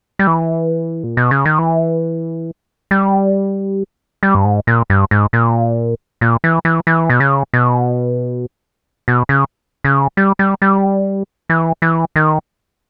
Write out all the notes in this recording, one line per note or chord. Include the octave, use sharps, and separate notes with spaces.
G3
E3
A#2
B2
C#3
D#3
E3
G3
G3
G2
G#2
A#2
G2
G#2
A#2
A#2
E3
E3
E3
B2
C#3
B2
B2
C#3
C#3
G3
G3
G3
E3
E3
D#3